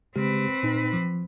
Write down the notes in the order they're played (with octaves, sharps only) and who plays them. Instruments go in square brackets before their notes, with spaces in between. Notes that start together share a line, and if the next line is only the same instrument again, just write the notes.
[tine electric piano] C#3 G#3 G4 [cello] C4 B4
[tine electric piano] A#2 D#4
F3